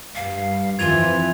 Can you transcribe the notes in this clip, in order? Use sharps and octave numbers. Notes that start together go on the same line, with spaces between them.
G2 F5
F2 E3 F4 G#6 F7